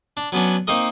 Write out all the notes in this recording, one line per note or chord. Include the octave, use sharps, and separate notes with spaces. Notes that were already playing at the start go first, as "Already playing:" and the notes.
D4
F#3 B3 C#4 D4
A#3 C4 D#4 A#4 D#5